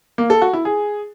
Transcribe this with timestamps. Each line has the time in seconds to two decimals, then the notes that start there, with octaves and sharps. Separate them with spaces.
0.18 A#3
0.30 A4
0.42 F#4
0.53 E4
0.65 G#4